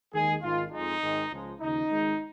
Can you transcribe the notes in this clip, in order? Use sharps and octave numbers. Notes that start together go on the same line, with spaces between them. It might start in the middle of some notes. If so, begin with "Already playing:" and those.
D#2 D#3 G#3 G#4
G#1 G#2 D#3 F4
F2 F3 G#3 D#4
G#1 G#2 D#3 G#3
C#2 C#3 F3 G#3
D#2 C#3 F3 D#4
G#1 G#2 G#3